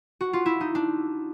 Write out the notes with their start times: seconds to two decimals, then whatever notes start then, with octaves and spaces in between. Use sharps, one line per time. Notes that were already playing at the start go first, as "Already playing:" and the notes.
0.21 F#4
0.33 F4
0.46 E4
0.60 D#4
0.75 D4